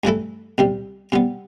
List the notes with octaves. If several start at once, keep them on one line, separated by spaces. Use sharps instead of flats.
G2 E3 A3 E4 A4
C2 C3 G3
C3 G3 B3